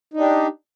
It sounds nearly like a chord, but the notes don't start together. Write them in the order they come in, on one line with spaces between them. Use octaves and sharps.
D#4 D4 G4